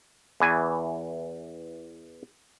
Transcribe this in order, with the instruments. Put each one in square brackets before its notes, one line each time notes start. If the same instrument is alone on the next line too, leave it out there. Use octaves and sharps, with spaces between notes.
[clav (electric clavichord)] E2 E3 G#5